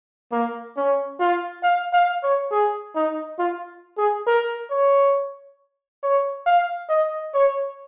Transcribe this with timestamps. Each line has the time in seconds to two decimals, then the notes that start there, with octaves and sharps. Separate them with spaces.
0.32 A#3
0.77 C#4
1.20 F4
1.63 F5
1.93 F5
2.23 C#5
2.51 G#4
2.95 D#4
3.39 F4
3.98 G#4
4.27 A#4
4.70 C#5
6.03 C#5
6.46 F5
6.89 D#5
7.34 C#5